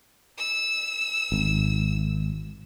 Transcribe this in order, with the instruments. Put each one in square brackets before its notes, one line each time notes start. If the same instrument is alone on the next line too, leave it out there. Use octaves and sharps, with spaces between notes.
[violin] E6
[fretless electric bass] G#1